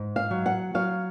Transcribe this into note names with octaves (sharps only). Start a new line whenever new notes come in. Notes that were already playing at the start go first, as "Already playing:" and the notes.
Already playing: G#2
F5
F#3
F#5
F#3 F5